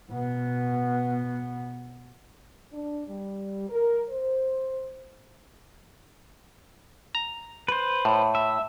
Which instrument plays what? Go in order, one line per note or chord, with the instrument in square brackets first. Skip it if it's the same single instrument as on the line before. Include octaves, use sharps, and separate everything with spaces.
[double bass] B2 B3
[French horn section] D4
G3
A#4
C5
[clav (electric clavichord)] A#5
[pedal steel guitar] B4 C5
[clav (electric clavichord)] A2
[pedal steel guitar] E5